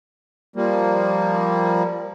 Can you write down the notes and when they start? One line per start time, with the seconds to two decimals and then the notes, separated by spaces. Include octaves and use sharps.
0.56 F3 G3 A#3